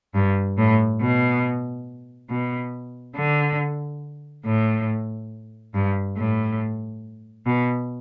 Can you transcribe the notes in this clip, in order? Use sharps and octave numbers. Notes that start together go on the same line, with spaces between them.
G2
A2
B2
B2
D3
A2
G2
A2
B2